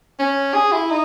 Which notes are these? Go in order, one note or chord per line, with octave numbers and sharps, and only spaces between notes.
C#4
G#4
E4
D#4